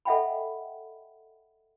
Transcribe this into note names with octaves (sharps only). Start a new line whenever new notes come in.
A4 D#5 E5 F#5 G5 B5